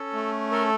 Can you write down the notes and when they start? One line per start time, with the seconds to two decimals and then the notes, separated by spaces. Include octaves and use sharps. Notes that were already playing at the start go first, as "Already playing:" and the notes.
Already playing: C#4 A4
0.13 A3
0.52 A4 A#4